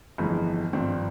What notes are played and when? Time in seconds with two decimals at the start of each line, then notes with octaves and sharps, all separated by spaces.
0.18 G1 F2 E3 G#3
0.73 G#1 G2 F3 C4